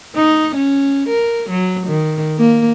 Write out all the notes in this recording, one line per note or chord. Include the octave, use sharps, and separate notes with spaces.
D#4
C#4
A#4
F#3
D#3
A#3